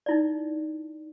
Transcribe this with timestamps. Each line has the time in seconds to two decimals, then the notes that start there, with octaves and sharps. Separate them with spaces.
0.06 D#4 E4 D5